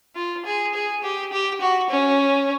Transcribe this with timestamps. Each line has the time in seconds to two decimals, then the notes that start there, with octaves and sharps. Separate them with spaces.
0.16 F4
0.45 G#4
0.74 G#4
1.03 G4
1.32 G4
1.61 F#4
1.90 C#4